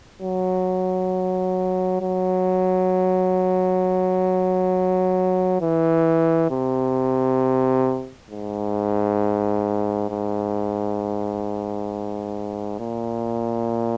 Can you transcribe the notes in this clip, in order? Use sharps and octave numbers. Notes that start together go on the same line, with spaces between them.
F#3
F#3
E3
C3
G#2
G#2
A#2